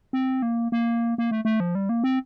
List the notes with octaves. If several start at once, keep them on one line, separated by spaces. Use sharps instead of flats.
C4
A#3
A#3
A#3
A3
A3
F3
G3
A#3
C4